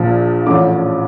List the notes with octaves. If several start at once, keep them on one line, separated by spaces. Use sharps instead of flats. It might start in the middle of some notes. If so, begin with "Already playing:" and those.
Already playing: A#1 A#2 F3
A1 A2 F3 D6